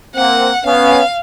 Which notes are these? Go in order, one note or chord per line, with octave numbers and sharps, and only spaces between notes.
A#3 C4 F#5
B3 C#4 F5